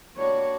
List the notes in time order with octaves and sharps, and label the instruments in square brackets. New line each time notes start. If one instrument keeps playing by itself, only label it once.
[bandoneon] G3 A#3 D4 F#4 [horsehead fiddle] C#5